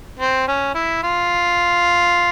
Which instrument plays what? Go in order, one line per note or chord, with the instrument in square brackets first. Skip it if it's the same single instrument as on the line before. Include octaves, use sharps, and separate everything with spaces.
[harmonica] C4
C#4
E4
F4